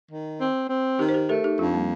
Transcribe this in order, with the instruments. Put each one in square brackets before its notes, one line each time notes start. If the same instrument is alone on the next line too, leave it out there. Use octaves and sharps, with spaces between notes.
[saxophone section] D#3
C4
C4
[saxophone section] D#3 [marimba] D#4 G4
[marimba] C5
G4 A#4
[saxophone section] A3 [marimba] G4 A#4
[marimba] D#4 G4
[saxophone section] F2 [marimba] D4 F4
[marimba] G3 A#3